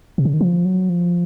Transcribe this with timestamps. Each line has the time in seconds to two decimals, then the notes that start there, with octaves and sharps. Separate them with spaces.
0.18 C3
0.25 C#3
0.34 D#3
0.41 F3
0.65 F#3
0.89 F3